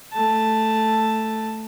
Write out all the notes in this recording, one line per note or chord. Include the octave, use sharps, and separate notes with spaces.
A3 A5